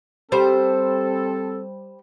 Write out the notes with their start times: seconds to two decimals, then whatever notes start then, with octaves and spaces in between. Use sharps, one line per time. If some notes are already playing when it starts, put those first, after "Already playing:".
0.32 G3 C4 A4 C5